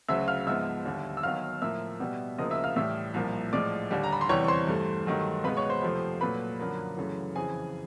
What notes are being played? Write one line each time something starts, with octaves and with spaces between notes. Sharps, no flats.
D2 C#3 F#3 E5 E6
F5 F6
G#2 F3 G#3 B3 E5 E6
D#2 D3 G3
E6
D#2 D#3 F#3 B3 F5 F6
A2 F3 A#3 E5 E6
B2 G3 B3
D2 C#3 F3 A#3 D#5 D#6
E5 E6
F5 F6
A2 E3 G3 E5 E6
C2 A#2 F3 A#3
A2 F3 G#3 D5 D6
D#2 D3 G3
A#5
B5
C6
E2 C3 E3 G3 C#5 C#6
C#6
C5 C6
G2 E3 A3
G2 D#3 F#3 A3
C#2 B2 G#3 B3 B4 B5
C#5 C#6
C5 C6
F2 C3 F3 A3
A#2 F#3 A3 B4 B5
F#2 D3 F3 A#3
F#2 C#3 E3 A3
F2 C#3 E3 G#4 G#5